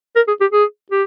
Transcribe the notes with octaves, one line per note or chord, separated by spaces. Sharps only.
A#4
G#4
G4
G#4
G4